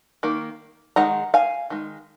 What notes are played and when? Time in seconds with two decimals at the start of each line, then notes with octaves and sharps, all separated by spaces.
0.23 D#3 A#3
0.96 D#3 G#3 D#4 F#5 A#5
1.34 F5 G#5
1.70 D#3 G#3